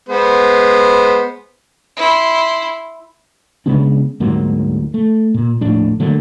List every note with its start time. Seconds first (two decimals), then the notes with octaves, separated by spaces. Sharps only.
0.09 G#3 B3 C5
1.97 E4 C6
3.66 C#3 G#3 B3 D4
4.20 D2 G#2 F#3 A#3
4.94 A3
5.34 A#2
5.61 D#1 A#1 A2 D4
6.00 D3 F#3 A3 A#3